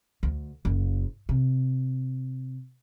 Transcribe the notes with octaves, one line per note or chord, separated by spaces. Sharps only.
D2
F#1
C3